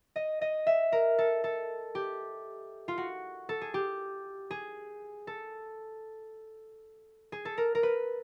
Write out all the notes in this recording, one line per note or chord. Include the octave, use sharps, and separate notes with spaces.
D#5
D#5
E5
A#4
A4
A4
G4
F4
F#4
A4
G#4
G4
G#4
A4
G#4
A4
A#4
A#4
B4